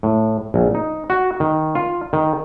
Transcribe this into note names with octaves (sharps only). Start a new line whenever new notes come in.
A2
A#1
D#4
F#4
D#3
F4
D#3